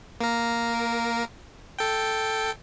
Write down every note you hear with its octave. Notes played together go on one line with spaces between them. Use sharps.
A#3 A#4
A4 G5